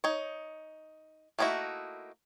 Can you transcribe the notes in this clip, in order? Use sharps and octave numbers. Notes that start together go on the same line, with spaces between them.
D#4 C#5
A3 A#3 D#4 E4 F#4